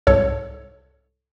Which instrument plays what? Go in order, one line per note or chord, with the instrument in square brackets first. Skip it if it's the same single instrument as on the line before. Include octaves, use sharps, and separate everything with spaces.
[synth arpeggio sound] C2 G#2 A4 C#5